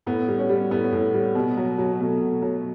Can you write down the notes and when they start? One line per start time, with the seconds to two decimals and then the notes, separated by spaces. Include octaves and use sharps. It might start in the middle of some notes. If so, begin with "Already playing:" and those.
0.06 A2 B3
0.28 G3
0.39 C#4
0.49 G3
0.71 A2 B3
0.92 A2
1.14 G3
1.35 B2
1.57 F#3
1.78 F#3
1.99 B2 A3
2.21 B2
2.42 F#3